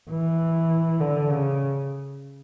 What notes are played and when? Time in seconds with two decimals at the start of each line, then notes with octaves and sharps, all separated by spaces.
0.10 E3
1.01 D3
1.31 C#3